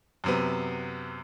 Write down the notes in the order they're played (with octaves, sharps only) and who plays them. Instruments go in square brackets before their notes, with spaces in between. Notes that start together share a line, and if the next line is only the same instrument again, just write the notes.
[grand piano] F#2 C3 B3